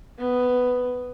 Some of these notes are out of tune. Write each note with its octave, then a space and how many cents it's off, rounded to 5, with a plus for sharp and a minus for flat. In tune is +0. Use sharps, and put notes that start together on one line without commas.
B3 +10